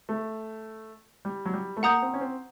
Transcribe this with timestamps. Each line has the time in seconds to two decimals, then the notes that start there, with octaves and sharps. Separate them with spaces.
0.09 A3
1.25 G3
1.45 F#3
1.54 G3
1.77 A3
1.83 A#3 F#5 A#5 D#6 G6
2.02 C4
2.14 C#4
2.21 C4